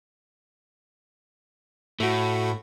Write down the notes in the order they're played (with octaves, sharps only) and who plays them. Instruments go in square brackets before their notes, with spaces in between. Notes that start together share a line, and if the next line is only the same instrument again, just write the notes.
[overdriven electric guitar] A2 [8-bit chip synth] A3 F#4